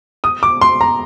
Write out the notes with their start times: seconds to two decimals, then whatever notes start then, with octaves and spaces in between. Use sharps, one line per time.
0.24 D#6
0.43 D6
0.61 C6
0.81 A#5